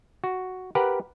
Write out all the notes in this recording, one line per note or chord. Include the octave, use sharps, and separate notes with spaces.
F#4
G4 A#4 B4 F#5